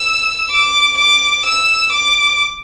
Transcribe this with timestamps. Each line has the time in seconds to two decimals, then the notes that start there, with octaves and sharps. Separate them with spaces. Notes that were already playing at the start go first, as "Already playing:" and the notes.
Already playing: E6
0.51 D6
0.98 D6
1.45 E6
1.92 D6